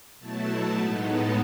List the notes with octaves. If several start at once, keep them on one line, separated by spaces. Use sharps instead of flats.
B2 F#3 A3 E4 A5
A2 G#3 B3 D#4 G#5
A5